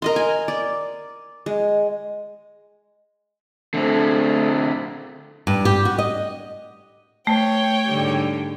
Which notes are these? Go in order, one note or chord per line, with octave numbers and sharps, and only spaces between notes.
A#4 D#5 C6
G#5
D5
G#3
D3 A3 C4
G2
G4
F#4
D#5
A3 C#5 G5
G#2 D3 G3